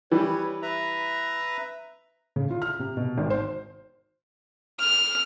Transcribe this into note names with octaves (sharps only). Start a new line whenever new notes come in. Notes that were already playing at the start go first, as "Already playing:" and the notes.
E3 G3 B4 C#5
B4 E5 A#5
C#3
F4
F6
C3
B2
G#1
C5
F6